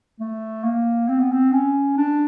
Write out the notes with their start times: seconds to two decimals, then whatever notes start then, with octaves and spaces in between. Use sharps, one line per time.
0.20 A3
0.64 A#3
1.08 C4
1.20 B3
1.32 C4
1.52 C#4
1.97 D4